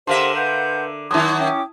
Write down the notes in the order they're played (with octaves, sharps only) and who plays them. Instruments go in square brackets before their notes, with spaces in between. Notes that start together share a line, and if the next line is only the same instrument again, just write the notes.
[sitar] D3 A#4 E5 [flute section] G4 C5 [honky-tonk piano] F5 A5 C6
[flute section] B4 F#5 G6
[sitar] D#3 F#3 [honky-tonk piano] E4 A5 D#6 [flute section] C6 D6 G#6
[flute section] C#4 G5 D6